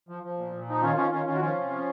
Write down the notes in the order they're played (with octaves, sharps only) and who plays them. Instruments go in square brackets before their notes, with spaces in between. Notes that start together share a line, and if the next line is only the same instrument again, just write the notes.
[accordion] F3
F3
A#2
A#2
F3 D#4
D#3 C#4 F4
D#3 C#4 F4
D#3 C#4 F4
D#3 C#4 F4
F#4
F3 C#4 F4
C3
F3